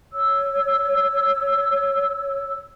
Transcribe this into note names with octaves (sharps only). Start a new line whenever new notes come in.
C#5 E6